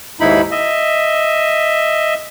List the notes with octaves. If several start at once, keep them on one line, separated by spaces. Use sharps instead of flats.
D#2 G#2 D#4 E4 B5
D#5 E5